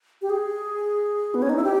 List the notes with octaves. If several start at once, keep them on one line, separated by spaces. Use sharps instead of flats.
G4
G#4
B3
C#4
D#4
E4
G4